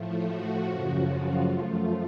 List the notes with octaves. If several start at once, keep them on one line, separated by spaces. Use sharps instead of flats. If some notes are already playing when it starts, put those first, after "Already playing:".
Already playing: A2 F3 A3
F#4
F#2 C#3 F3
F4
F#2 F3 A3 F4